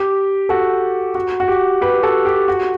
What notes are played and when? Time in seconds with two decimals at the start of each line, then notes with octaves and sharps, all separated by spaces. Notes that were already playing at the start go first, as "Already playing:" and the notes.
Already playing: G4
0.49 F#4 A4
1.15 F#4
1.40 F#4
1.48 G4
1.81 G4 B4
2.03 F#4 A4
2.25 G4
2.48 F#4